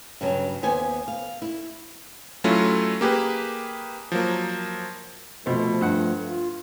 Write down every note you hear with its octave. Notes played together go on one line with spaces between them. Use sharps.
G2 C#3 F#3
D#2 B3 C5 G#5
F5
E4
F#3 A3 C#4 E4 F4
A#3 G4 G#4 B4
F3 F#3 A#3
B2 F3 A3 C4
G2 F#5
F4